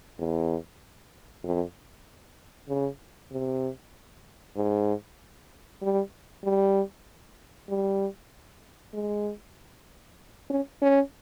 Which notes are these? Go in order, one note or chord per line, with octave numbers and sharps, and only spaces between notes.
E2
F2
C#3
C3
G#2
G3
G3
G3
G#3
C#4
C#4